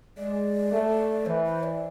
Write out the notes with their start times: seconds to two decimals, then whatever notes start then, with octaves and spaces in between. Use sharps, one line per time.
0.18 G#3 D5
0.72 A3
1.26 E3 C5
1.44 C5
1.63 D5